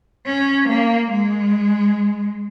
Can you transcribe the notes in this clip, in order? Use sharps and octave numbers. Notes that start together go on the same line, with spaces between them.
C#4
A#3
G#3